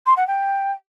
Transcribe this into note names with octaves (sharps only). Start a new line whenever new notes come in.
C6
F#5
G5